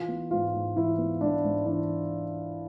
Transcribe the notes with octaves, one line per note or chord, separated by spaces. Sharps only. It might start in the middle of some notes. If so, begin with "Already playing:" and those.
Already playing: E3 F4
B3
G#2 F4
G#2
E3 E4
B3
G#2 D4
G#2
E3 D4